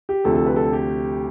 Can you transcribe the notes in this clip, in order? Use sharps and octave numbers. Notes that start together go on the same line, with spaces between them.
G4
D2 C3 F3 A4
A4
B4
A4
G4